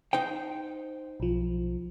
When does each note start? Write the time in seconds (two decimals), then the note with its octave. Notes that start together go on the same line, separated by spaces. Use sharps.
0.13 D#4 C5 G5
1.20 B1 F3